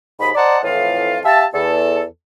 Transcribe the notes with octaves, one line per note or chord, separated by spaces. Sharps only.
D#2 G#2 D#5 B5
C5 D5 D#5 F#5 A5 A#5
F2 A2 E3 F4 F5
G4 E5 F5 A5
E2 A4